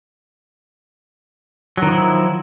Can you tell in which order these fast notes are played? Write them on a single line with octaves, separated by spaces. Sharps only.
F#3 D#3 F3 E4